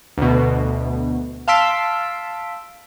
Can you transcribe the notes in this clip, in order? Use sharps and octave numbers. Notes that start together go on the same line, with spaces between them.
D2 B2
F5 A5 C6 E6 B6 D7